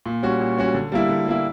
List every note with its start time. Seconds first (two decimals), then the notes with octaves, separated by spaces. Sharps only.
0.06 A#2
0.23 G3 C#4 F#4
0.40 A#2
0.57 G3 C#4 F#4
0.74 D3
0.92 G3 A#3 E4
1.09 D3
1.26 G3 A#3 E4